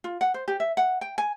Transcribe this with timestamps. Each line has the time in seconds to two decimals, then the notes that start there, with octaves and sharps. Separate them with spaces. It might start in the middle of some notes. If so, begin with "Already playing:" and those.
0.04 F4
0.21 F#5
0.34 C5
0.48 G4
0.60 E5
0.77 F#5
1.01 G5
1.18 G#5